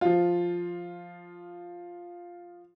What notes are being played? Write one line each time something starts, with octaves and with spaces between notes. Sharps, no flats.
F3 F4